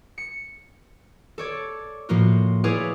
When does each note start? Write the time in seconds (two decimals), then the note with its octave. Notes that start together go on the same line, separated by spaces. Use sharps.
0.18 C#7
1.38 A4 C#5 D5
2.09 A2 F3 A#3 F4 F#4
2.64 E4 G#4 B4 C#5 D5 F5